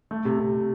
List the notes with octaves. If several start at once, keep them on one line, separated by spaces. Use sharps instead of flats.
A3
C3
C3